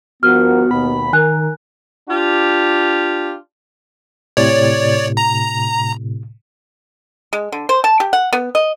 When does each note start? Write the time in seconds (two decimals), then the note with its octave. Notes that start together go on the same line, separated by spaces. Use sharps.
0.23 G2 F3 B3 F#4 A#4 F6
0.71 D#2 B2 B5
1.13 D#3 A#4 G#5 F#6
2.09 D4 F4 G4
4.37 A2 C3 C#5 D5
5.17 A#5
7.33 G#3
7.52 D3
7.69 C5
7.84 A5
8.00 G4
8.13 F#5
8.33 B3
8.55 D#5